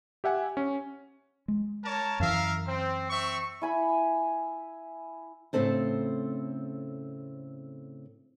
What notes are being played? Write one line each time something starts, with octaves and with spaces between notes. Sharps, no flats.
G4 E5 F#5 G#5
C#4
G#3
A#4 C#5 A5
F#2 E3 A#4 E5 F5
C4
C4 E5 C#6
E4 G#5 B5
A2 C#3 B3 C4 A4 C5